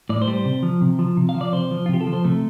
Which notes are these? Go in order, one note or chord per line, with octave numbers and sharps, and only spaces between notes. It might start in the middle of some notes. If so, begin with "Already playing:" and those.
A2 D5
C5
G3
C5
C3
F3
C3
F3
C3
F5
F3
D5
C3 C5
F3
F4
C3 G4
A4
F3
C5
C3 A3